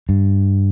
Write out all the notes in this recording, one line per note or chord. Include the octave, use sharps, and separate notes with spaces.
G2